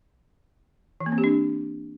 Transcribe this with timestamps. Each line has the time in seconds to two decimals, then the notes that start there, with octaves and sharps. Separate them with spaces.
1.00 E3
1.06 A#3
1.12 C4
1.18 G4
1.24 D4